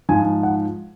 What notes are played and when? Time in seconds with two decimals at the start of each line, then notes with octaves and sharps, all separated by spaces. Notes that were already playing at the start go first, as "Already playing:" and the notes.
0.09 G#2 F3 G#5
0.43 F#5